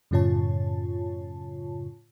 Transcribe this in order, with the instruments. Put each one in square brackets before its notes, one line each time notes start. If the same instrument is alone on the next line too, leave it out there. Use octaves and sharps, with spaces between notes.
[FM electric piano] F#2 A2 C#3 F4 C#5 A5